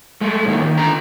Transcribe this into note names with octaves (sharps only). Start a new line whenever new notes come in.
G#3 A3
A2 D#3 A#3
D#3
D3 A#5